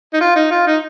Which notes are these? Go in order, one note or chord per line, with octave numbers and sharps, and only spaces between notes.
D#4
F4
D#4
F4
D#4